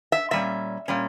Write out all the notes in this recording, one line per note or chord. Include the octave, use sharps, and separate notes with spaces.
E5
A#2 G3 C#4 E5
A#2 G3 C#4